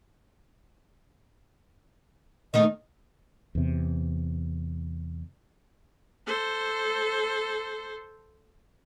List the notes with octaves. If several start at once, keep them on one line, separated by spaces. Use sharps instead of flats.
D#3 A3 D#4 D#5
E2 C3
A4 C5